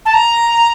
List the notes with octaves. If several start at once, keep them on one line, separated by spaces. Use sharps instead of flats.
A5
A#5